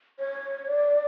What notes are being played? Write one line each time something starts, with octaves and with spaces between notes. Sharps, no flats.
C#5
D5